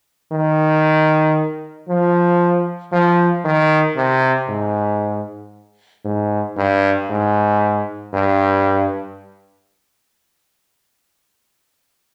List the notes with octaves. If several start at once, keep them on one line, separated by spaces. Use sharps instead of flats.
D#3
F3
F3
D#3
C3
G#2
G#2
G2
G#2
G2